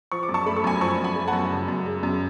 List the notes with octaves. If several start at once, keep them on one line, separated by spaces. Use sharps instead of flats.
F3 C#6
D6
F#2
A5 C#6
A3 B5
C#6
F#2 G#5 B5
F3 A5 C#6
F#2
G#5 B5
A3
F#5 A5
F#2
C#3
F#2
G#3
F#2